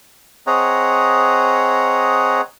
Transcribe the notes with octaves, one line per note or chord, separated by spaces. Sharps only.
C4 G#4 C#5 D#5 F#5 A#5